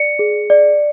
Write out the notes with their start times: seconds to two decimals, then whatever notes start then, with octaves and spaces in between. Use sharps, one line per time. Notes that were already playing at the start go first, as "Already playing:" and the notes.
Already playing: D5 C#7
0.19 G#4
0.50 D5